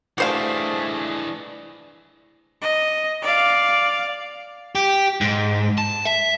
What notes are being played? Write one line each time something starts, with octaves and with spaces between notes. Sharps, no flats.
E3 A3 D4 F#4 G#4 C5 F5
D#5
D5 F5
G4
G#2
A5
E5